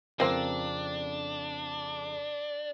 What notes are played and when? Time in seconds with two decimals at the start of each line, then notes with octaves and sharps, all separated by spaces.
0.20 F2 C#3 F3 A#3 C4 D4